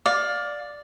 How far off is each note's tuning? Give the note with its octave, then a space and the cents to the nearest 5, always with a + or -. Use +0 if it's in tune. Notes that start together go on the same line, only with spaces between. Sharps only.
D5 +0 F5 +20